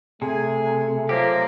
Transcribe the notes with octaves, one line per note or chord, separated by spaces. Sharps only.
C3 A3 G#4 G#5
F3 F#3 A#3 G4